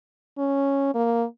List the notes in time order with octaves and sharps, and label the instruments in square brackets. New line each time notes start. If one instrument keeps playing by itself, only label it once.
[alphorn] C#4
A#3